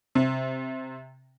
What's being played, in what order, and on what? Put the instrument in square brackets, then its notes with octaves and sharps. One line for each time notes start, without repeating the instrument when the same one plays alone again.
[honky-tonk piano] C3